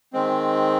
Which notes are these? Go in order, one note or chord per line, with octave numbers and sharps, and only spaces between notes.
D#3 G#3 C4